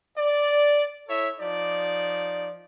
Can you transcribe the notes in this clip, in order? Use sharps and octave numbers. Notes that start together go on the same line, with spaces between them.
D5
E4 A4 C#5 E5
F3 D#4 D5